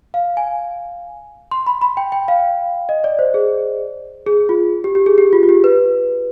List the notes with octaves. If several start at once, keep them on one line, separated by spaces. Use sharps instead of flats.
F5
G#5
C6
B5
B5
G5
G5
F5
D#5
D5
C5
G#4
G#4
F4
G4
G4
G#4
G4
F4
F4
G4
B4